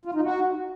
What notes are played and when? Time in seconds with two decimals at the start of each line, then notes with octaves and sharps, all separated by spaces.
0.05 F4
0.14 D#4
0.23 F#4